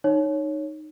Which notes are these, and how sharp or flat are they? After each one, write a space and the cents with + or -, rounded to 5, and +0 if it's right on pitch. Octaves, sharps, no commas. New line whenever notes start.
D#4 -15 C#5 +0